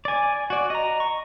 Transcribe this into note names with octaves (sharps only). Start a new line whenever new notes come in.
D5 G#5
F#4 D5
D#5 A#5
C#6